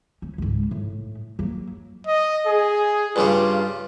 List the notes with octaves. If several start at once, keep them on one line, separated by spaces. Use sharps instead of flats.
C#4
C#2 G#2
A2
F#3 A#3
D#5
G#4
G2 C#3 G3 F4